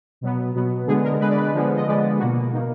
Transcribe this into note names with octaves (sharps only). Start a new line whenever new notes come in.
B2 F#3 B3
B2 F#3 B3
D3 G#3 B3 G#4
A#4
D3 G#3 B3 B4
D5
B4
D3 F3 G#3 B3
D#5
D3 F3 G#3 B3 D5
B2 A#3 F#4
B2 A#3 D#4